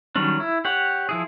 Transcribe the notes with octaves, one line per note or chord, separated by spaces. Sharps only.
D#3 F#3 G3 C#4 D4
E4
G4 C#5 F#5
F3 E4 G#4